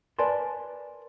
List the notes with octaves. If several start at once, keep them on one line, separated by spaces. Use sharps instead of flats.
A#4 B4 D5 G#5 A5 C6